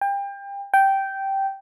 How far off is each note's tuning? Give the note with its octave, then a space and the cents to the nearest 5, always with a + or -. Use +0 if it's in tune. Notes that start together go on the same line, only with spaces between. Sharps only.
G5 +30
G5 -10